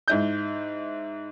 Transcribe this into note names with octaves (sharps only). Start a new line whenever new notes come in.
G#2 E4 G6